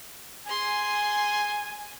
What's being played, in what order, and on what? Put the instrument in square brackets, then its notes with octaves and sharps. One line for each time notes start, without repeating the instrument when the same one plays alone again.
[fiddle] G#4 C6 [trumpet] G#5